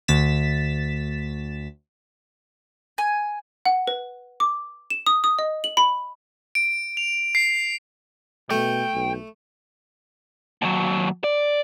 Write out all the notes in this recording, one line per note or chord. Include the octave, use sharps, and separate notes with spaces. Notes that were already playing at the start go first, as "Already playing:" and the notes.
D2 A6 B6 E7
G#5
F#5
B4
D6
E7
D#6
D#6
D#5
F#7
B5
D7
F7
C7
B2 A3 G5
B1
D#2 F#3
D5